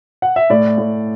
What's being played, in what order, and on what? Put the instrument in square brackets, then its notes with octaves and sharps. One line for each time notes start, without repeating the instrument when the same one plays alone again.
[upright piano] F#5
E5
A2 D5
A2